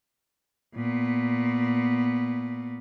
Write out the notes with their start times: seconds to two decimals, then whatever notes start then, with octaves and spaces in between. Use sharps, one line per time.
0.75 A#2 B3